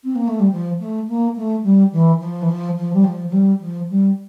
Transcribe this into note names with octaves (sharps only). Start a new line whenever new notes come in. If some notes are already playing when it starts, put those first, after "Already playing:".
C4
A#3
A3
G3
F3
A3
A#3
A3
G3
E3
F3
E3
F3
F3
G3
F3
F3
G3
F3
G3